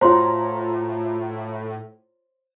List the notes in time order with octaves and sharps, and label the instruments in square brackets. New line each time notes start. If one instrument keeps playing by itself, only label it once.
[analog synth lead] A2 [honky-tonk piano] F4 F#4 A#5 [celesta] C5 C#5 C6